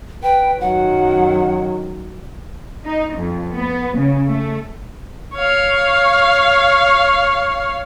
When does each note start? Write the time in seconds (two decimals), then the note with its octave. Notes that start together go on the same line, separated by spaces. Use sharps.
0.23 B4 G5
0.61 F#2 D#3 F#3 F#5
2.85 D#4
3.15 F2
3.54 B3
3.96 C#3
4.30 A3
5.34 C#5 F5